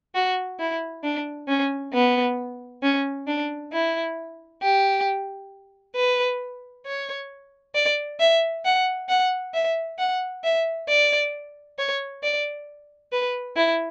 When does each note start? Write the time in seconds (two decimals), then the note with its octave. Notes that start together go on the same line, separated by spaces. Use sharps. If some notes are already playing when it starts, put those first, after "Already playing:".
0.15 F#4
0.59 E4
1.03 D4
1.48 C#4
1.94 B3
2.83 C#4
3.27 D4
3.72 E4
4.62 G4
5.96 B4
6.86 C#5
7.75 D5
8.19 E5
8.65 F#5
9.09 F#5
9.54 E5
9.98 F#5
10.44 E5
10.88 D5
11.78 C#5
12.23 D5
13.12 B4
13.56 E4